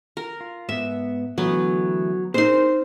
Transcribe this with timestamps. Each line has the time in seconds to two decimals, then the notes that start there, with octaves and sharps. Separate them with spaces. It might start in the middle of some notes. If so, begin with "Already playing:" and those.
0.17 A#4
0.41 F4
0.69 G#2 B3 E5
1.38 D3 E3 F#3 A3 B3
2.34 C4 C#4 D#4 G#4 A#4 C5 C6